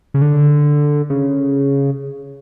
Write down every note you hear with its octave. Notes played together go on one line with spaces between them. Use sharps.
C#3
D3
C#3